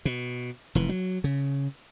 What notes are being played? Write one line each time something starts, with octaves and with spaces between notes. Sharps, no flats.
B2
F1 E3
F#3
C#3